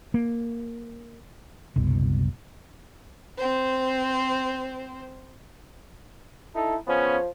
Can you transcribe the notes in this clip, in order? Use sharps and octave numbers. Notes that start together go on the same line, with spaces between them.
A#3
F#1 C2 B2
C4 C5
D#4 E4 A4
C#3 F3 B3 C#4